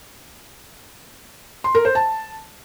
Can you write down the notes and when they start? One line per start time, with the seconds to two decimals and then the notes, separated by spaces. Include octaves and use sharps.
1.64 C6
1.75 A#4
1.85 C5
1.95 A5